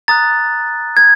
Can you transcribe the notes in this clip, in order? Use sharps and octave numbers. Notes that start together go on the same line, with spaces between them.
A#5 D#6 F#6 A6
G#6